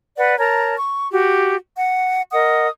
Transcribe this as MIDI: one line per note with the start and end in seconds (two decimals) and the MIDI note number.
0.16 0.38 71
0.16 0.38 74
0.16 0.38 78
0.39 0.75 70
0.39 0.75 73
0.39 0.75 81
0.39 0.75 82
0.77 1.08 85
1.11 1.55 66
1.11 1.55 67
1.76 2.22 78
2.32 2.68 70
2.32 2.68 75
2.32 2.68 78
2.32 2.68 87